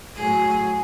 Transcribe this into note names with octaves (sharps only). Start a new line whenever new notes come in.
A2 F#3 G#4